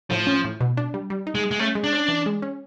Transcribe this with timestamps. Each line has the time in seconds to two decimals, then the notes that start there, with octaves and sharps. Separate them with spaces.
0.10 A2 F3
0.27 C#4
0.45 A2
0.61 B2
0.77 D4
0.94 G3
1.10 G3
1.27 D#4
1.35 G#3
1.43 G#4
1.51 G#3
1.59 A3 C#4
1.75 G#3
1.84 D4
1.93 C#4
2.08 E3
2.26 G#3
2.42 C#4